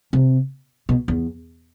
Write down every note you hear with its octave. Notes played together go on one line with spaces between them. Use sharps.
C3
B2
E2